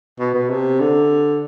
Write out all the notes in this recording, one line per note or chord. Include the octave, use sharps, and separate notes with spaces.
B2
B2
C3
D3